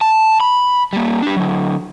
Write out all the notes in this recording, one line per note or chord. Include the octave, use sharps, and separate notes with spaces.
A5
B5
G3 A#3
D4 G4
D3 F#3